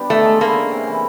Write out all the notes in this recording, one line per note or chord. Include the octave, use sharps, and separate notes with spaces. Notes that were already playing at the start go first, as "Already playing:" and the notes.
Already playing: G3 B3 D4 G4
D#3 A3
G#3
A#3 E4
C#4
C3
E3